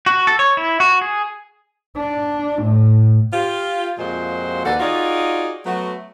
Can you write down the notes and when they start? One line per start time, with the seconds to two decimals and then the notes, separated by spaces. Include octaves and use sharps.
0.06 F#4
0.27 A4
0.39 C#5
0.57 E4
0.80 F#4
1.01 G#4
1.97 D4
2.62 A2
3.33 F4 G4
3.99 F2 A#2 G#3 F#4 C5
4.65 D#2 A4 B4 D5 F#5
4.80 D#4 F4 F#4 G#4 D5
5.65 F#3 A3 B3 F#4